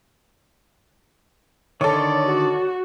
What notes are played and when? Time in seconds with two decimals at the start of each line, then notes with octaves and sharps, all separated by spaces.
1.81 D3 D#3 A4 C#5 D5
2.25 F#4